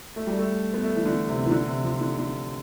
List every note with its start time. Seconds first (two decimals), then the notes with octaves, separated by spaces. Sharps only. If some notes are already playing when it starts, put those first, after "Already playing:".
0.16 A3
0.27 G3
0.39 A3
0.74 B3
0.83 A3
0.96 E3
1.06 D3
1.28 C3
1.46 E3
1.51 D3
1.68 C3
1.84 F3
2.01 D3
2.18 D3